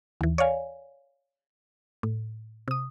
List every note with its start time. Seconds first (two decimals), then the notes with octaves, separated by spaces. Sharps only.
0.21 D#2 E3
0.38 C#5 D5 F5 G#5
2.03 A2
2.68 C3 D#6